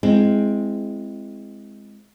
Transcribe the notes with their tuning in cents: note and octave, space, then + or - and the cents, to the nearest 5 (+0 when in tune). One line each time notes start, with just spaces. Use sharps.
G#3 +0 C4 +0 E4 +30